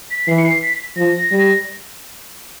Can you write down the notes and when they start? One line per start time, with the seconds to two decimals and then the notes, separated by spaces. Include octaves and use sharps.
0.11 B6
0.28 E3 C7
0.38 C#7
0.45 C7
0.62 B6
0.96 F3 A#6
1.31 G3